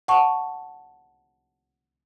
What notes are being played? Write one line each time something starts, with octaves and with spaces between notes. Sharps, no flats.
F#5 A5 C#6